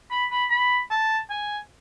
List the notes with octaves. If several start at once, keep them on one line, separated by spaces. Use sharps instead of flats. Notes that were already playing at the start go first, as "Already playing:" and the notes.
B5
B5
B5
A5
G#5